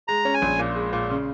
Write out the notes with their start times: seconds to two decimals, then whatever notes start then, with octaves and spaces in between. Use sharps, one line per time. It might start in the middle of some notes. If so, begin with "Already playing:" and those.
0.08 G#3 A#5
0.25 C#4
0.34 G#5
0.42 A#1
0.59 A#2
0.75 G#3
0.93 A#2
1.10 C#3